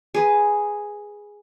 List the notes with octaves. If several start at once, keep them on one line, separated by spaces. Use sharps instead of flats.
G#4 B4